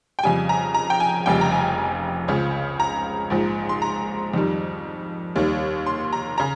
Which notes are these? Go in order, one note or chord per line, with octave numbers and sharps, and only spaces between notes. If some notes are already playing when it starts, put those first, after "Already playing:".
G5
F2 C#3 G3 G#5
A#5
A#5
G5
G#5
F1 F2 C#3 G3 G5
A#5
G#5
C#2 C#3 F3
A#5
A#1 G#2 F3
C6
A#5
F2 D#3 G3
D#2 D#3 G3
C6
A#5
C#3 A#5